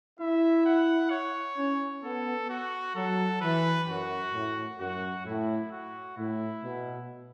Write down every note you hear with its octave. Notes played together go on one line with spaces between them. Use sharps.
E4 E5
F#5
C#5
C#4
B3 A4
F#4
F#3 A4
E3 B4
F#2 F#4
A2
F#2 F#4
A2 E4
F#4
A2 E4
B2